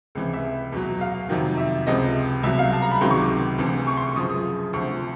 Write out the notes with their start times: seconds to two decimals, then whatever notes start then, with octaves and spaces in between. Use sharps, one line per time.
0.15 C#2 C3 E3
0.34 E5
0.72 E2 B2 F#3
1.01 F5
1.29 F2 C3 D#3 F#3
1.58 E5
1.87 C#2 C3 F3 D#5
2.43 C2 B2 F#3 E5
2.59 F5
2.73 A5
2.82 A#5
2.91 B5
3.01 C#2 C3 D#3 F#3 C6
3.10 C#6
3.20 D6
3.58 D2 C3 E3
3.87 C#6
3.97 C6
4.07 C#6
4.16 F#2 C#3 F3 D#6
4.30 D#6
4.73 D2 C3 F3 C#6